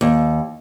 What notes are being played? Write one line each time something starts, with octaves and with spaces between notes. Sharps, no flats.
D#2